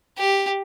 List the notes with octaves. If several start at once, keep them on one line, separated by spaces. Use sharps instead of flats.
G4